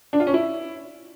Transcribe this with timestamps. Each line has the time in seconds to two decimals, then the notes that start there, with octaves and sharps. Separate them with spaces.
0.13 D4
0.20 F4
0.27 C#4
0.34 E4